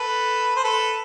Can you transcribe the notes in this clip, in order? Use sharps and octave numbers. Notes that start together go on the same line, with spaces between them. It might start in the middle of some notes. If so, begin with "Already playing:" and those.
Already playing: A4 B4
C5
A4 B4